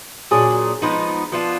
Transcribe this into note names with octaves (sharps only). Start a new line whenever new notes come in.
A#2 F#3 D4 G#4
F3 G#3 B3 D#4
F3 B3 D4 F4